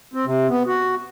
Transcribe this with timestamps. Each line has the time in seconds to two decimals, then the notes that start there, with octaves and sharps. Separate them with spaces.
0.14 C4
0.26 C3
0.49 B3
0.67 F#4